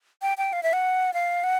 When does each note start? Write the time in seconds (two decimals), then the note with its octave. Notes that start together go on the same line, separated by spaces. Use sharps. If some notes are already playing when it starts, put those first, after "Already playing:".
0.22 G5
0.38 G5
0.53 F5
0.63 E5
0.73 F#5
1.14 F5
1.44 F#5